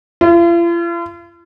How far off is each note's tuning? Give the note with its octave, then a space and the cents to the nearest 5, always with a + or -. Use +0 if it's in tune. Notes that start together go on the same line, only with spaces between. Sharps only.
F4 -45